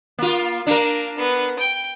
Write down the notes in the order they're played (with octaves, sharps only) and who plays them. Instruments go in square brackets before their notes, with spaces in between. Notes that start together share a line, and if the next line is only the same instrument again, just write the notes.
[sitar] A#3 F4
[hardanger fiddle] A#3 [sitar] D4 A#4
[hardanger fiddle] B3
G5